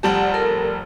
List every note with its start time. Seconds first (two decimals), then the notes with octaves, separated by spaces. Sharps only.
0.03 F1 G3 G4 D5 F#5 A5
0.34 A4 A#4